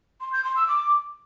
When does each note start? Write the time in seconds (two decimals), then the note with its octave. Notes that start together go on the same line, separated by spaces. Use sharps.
0.20 C6
0.32 G6
0.44 C6
0.56 E6
0.68 D6